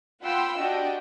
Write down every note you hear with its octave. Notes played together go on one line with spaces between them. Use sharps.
F4 F#5 G5 B5 C6 E6
D4 F#4 G4 D#5 G5